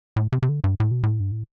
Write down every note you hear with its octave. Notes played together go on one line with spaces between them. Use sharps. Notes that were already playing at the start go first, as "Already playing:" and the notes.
A2
C3
C3
D3
G2
A2
B2
A2
G2
A2